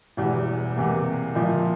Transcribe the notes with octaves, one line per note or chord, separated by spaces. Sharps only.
E1 E2 E3 G3
E2 C3 E3 A#3
A#2 F3 A#3 E4